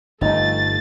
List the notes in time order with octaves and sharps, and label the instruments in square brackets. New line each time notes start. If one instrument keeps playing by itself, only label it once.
[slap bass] G1 F3 [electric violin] A3 A6 [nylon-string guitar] D#4